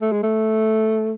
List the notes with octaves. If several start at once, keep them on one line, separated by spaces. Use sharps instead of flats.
A3
G#3
A3